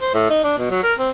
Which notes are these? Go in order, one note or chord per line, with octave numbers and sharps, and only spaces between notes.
C5
A2
D#4
D4
B2
F#3
A#4
C4